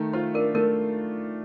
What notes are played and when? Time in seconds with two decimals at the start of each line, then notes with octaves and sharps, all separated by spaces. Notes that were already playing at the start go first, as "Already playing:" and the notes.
Already playing: D#3 A3
0.13 F4 C5
0.34 D4 A#4
0.55 A3 A#4